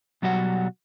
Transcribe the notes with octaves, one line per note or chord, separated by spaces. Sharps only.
B2 F#3 G3 F#4 D5 F#5